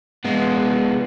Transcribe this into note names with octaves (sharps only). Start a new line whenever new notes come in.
G#3 B3